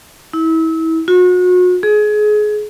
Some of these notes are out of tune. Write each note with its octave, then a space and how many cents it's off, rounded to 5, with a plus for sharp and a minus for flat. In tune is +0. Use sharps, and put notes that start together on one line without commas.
E4 -30
F#4 -35
G#4 +25